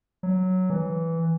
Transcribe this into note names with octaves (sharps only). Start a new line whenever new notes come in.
F#3
E3